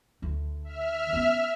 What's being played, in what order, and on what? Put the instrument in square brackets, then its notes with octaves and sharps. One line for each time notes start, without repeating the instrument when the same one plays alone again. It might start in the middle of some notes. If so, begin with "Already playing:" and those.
[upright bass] D2 D3
[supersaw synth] E5 F6
[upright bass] B3 C#4